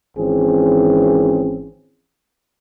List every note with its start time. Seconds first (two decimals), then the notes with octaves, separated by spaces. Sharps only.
0.17 G#1 E3 C4 C#4 G#4